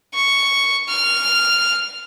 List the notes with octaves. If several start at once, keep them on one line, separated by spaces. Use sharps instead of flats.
C#6
F6